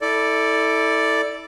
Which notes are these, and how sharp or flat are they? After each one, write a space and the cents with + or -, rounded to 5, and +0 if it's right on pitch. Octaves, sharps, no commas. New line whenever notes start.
E4 -25 A4 +10 D5 +0